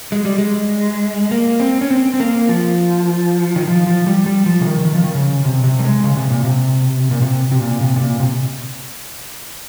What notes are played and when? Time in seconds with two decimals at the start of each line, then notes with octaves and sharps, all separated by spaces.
0.12 G#3
0.25 G3
0.38 G#3
1.31 A#3
1.60 C4
1.81 C#4
1.91 C4
2.14 C4
2.20 A#3
2.49 F3
3.56 D#3
3.68 F3
3.87 F3
4.07 G3
4.26 G3
4.46 F3
4.61 C#3
4.66 D#3
4.85 D#3
4.95 F3
5.04 D#3
5.15 C#3
5.45 C3
5.64 C3
5.79 G3
5.84 G#3
6.04 C#3
6.17 C3
6.30 A#2
6.44 C3
7.11 A#2
7.22 C3
7.52 C3
7.61 A#2
7.81 C3
7.96 C3
8.00 A#2
8.20 C3